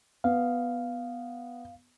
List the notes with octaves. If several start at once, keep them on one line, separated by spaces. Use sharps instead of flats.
B3 F5